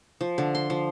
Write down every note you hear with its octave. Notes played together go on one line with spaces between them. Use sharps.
F3
D3
C6
F3